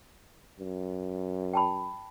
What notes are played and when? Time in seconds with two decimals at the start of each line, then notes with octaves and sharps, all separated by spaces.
0.60 F#2
1.53 G5 A5 B5